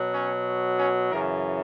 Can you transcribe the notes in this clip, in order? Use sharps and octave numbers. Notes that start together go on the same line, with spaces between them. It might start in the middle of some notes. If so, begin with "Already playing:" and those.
Already playing: B2 F#3
C#4
C#4
F#2 C#3 E3 A#4